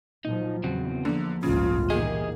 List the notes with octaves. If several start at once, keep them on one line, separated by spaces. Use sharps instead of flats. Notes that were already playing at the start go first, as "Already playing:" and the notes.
A#2 F3 F#3 D#4
E2 C#3 C4 F#4
D3 F3 A#3
G1 C#2 A2 C#3 F4
A#2 D#3 E3 A#3 G4 G#4 D#5